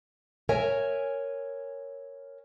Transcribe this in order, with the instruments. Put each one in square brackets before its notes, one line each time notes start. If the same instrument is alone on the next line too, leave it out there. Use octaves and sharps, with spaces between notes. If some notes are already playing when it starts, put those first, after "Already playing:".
[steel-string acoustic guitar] A#4 C#5 E5 G#5